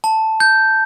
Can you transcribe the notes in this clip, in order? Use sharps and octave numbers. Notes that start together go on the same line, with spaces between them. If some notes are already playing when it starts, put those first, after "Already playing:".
A5
G6